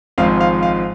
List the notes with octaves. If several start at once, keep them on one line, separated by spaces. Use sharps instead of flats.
G#1 G#2 F3 F5
F5
F5